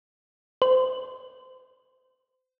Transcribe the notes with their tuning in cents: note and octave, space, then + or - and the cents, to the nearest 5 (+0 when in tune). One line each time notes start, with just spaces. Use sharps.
C5 -30